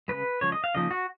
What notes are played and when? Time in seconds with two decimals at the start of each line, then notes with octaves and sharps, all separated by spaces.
0.08 C#3 F3 G#3 B4
0.41 C#3 F3 G#3 C#5
0.52 D#5
0.64 F5
0.75 C#3 F3 A#3 D#4 D#5
0.91 F#4